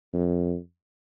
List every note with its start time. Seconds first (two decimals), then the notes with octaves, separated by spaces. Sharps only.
0.13 F2